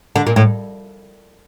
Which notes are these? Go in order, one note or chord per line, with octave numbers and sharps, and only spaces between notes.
D3
A#2
A2